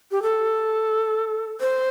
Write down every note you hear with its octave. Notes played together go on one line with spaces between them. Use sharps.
G4
A4
C5